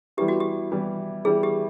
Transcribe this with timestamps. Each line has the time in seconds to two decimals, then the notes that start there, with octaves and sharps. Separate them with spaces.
0.17 E3 G3 B3 E4 G4
0.28 F#4
0.40 G4
0.71 E3 G3 B3 E4
1.25 E3 G3 B3 E4 G#4
1.43 G4